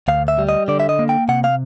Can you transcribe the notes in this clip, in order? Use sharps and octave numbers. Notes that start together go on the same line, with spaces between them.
D2 F5
E5
G3
D#5
D3 D5
E5
D#5
A#3
G5
C3 F#5
F5